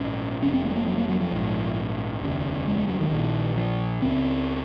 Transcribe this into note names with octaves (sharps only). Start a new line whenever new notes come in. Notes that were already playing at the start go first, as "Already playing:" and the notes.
Already playing: A#1 G#2 C#4
F1 F2 C3 C#4
C4
A#3
G#3
A#3
F#3
A#3
F#3
F3
A#1 G#2
F1 D#2 C#3
G#3
G#3
F#3
D#3
A#1 A#2
F3
C#2 C#3 C4